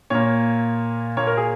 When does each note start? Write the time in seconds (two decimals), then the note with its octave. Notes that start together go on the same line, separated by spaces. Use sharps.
0.10 A#2 A#3 C#5
1.17 A#2 A#3 C#5
1.27 A#4
1.37 G#4